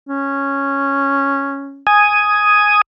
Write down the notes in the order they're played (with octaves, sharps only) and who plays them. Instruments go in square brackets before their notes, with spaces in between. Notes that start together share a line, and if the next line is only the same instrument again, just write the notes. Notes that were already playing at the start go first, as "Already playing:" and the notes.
[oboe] C#4
[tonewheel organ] G#5 D#6